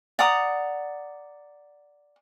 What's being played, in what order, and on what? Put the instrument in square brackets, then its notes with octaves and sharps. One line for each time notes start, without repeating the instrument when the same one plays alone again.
[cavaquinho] D5 F#5 A#5 D#6